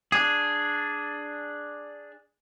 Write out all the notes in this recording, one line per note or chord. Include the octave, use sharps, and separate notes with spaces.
D4 G#4